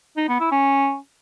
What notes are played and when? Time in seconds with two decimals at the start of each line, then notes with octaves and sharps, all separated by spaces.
0.17 D#4
0.29 B3
0.40 E4
0.52 C#4